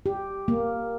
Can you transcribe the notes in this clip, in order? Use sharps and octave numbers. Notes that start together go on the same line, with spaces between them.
G4
A#3